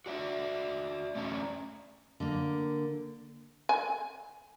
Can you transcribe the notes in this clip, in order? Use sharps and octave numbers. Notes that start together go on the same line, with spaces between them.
F#4 D5 E5
A3 C#4 D5 A#5
D3 A#3
G#5